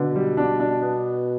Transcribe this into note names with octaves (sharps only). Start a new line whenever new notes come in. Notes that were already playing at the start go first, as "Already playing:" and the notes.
Already playing: B2 D3
G3
D4
D4
B3